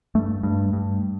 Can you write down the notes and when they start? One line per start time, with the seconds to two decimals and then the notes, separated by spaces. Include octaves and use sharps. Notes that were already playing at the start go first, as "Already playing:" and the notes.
0.15 G2 A3
0.43 G2
0.73 G2